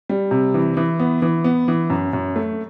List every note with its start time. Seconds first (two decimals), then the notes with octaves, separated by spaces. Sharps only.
0.09 G3
0.31 C3
0.54 E3
0.77 E3
0.99 B3
1.22 E3
1.44 B3
1.68 E3
1.90 F#2
2.13 F#2
2.36 A3